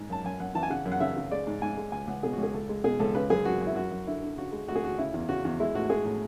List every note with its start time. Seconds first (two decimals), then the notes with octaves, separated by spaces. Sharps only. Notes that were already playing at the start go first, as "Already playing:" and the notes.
Already playing: G#2
0.09 F#2 A5
0.24 F#2 G#5
0.40 F#2 F#5
0.55 E3 A5
0.63 G#5
0.70 C#3 F#5
0.85 F#2
0.92 F#5
1.00 C#3 E5
1.17 C#3
1.31 G#3 D5
1.47 G#2
1.62 G#2 G#5
1.77 G#3
1.92 C#2 G#5
2.07 C#2 F#5
2.23 B2 G#4
2.33 F#4
2.38 C#2 G#4
2.54 C#2 A4
2.69 G#3
2.84 B2 G#4
3.00 C#2 A4
3.15 C#3 B4
3.30 F#2 G#4
3.45 F#2 F#4
3.61 F#2
3.67 E4
3.76 F#2 F#4
3.92 F#2
4.07 D3 E4
4.22 D3
4.37 C#3 F#4
4.52 G#3
4.68 D2 F#4
4.75 G#4
4.83 D2 F#4
4.98 C#3 E4
5.14 E2
5.29 C#3 F#4
5.45 E2
5.60 G#3 E4
5.75 A2 F#4
5.90 G#3 G#4
6.05 A2